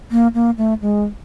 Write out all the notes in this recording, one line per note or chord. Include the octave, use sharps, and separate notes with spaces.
A#3
A#3
A3
G#3